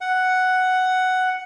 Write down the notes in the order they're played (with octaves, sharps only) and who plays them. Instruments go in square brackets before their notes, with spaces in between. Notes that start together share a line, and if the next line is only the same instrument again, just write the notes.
[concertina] F#5